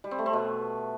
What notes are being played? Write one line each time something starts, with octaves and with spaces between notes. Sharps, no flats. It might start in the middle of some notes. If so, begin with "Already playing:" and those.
G3
C4
A3
C4
B2